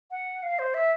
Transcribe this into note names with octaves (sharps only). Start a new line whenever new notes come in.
F#5
F5
C5
E5